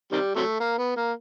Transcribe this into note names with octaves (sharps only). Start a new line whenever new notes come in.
C3 D#3 G3
C3 F#3 A3
A#3
B3
A#3